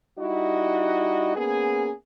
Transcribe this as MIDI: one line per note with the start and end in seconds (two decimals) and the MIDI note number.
0.19 1.35 55
0.19 1.35 63
0.19 1.35 64
0.19 1.35 66
0.19 1.35 75
1.35 1.91 58
1.35 1.91 59
1.35 1.91 61
1.35 1.91 68